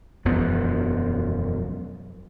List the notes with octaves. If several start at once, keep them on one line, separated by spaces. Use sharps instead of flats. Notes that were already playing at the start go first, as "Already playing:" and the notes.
E1 F#2 F3 B3